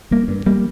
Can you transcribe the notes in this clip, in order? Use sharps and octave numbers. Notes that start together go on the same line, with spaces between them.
G3 A#3
G2
G3 A#3